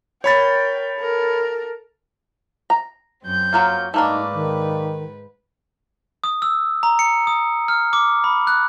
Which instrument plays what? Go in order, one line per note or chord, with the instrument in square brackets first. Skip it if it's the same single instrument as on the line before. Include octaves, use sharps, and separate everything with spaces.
[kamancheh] A#4 G5 [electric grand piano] C#5 B5 A6
[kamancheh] A4 A#4
[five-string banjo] A#5
[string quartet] F#2 C4 G6
[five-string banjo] F#3 A#3 F4
[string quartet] G#2 B4 [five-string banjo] A3 A#3 D4 [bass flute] D#4
[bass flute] D#3
[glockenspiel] D#6
E6
A#5
C#7
D#6
F6
D6
B5
F#6